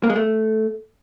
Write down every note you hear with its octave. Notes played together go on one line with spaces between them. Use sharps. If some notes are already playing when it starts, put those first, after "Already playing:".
A#3
G#3
A3